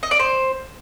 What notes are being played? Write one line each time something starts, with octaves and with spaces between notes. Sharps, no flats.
D#5
D5
C5